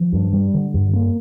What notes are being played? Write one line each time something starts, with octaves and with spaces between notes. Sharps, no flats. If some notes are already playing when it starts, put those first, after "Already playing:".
Already playing: F3
G2
G3
D3
G2
A#3